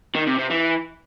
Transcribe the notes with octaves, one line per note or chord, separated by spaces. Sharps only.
D#3
C3
C3
E3